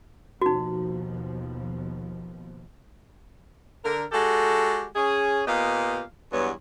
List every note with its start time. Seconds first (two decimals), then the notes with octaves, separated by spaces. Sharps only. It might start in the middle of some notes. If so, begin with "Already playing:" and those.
0.42 D#2 B2 F3 D#4 F#4
3.84 D3 A#4
4.12 G#3 F#4 G4 A4
4.95 C#4 G#4
5.47 A#2 B3 G4 D#5 F5
6.32 E2 G2 F#3 B3 C#5